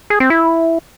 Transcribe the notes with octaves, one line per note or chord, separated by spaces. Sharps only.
G#4
C4
E4